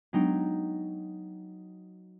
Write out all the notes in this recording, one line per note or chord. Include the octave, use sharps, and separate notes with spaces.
F#3 G#3 B3 D4 D#4 G5